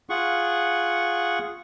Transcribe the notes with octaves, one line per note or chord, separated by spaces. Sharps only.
F4 G#4 F#5 C#6